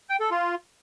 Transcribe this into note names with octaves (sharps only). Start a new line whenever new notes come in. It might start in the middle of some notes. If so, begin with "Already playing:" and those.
G5
A4
F4